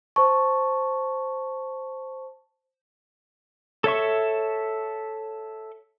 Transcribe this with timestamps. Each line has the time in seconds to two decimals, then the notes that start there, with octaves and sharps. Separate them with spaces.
0.16 C5 A5 C#6
3.84 A4 C#5 E5 C#6